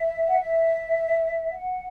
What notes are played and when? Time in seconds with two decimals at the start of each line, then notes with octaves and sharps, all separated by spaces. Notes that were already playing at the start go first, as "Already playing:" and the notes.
Already playing: E5
0.28 F#5
0.40 E5
1.49 F#5